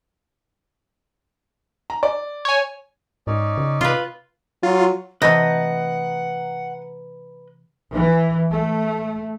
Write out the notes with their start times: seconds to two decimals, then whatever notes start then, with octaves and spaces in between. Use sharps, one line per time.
1.90 A#5
2.03 D5
2.45 C#5 G#5
3.27 G#2 C#4 D#4 D5
3.58 C#3
3.81 C3 F4 B4
4.63 F#3 F4
5.22 C3 E3 A3 B4 D#5 F#5 A#5 G6
7.94 E3
8.51 A3